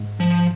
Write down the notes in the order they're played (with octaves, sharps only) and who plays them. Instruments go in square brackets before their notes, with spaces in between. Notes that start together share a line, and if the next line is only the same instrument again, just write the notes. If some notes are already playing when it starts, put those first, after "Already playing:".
Already playing: [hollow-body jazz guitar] G#2
[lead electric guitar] F3